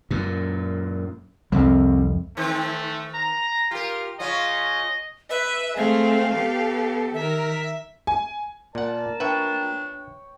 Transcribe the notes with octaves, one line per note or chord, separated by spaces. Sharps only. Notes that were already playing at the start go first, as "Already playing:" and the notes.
F#2 A#2
C2 F2 G3 C4
D#3 A3 C4
A#5
F4 G4 A#4
C#3 C#4 F4 D#5
B4 E5
A3 C4 G#4 F5
B3 G4 A4
D#3 A#4 E5
G#5
A#2 A#4 D5 F#5 A5
D4 B4 C#5 E5 G5